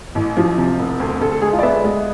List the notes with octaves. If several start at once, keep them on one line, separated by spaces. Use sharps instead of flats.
A1
F3
C3
E1
D2
D2 A4
A4
G#3 G#4
F4
D5
B3 E5
G#3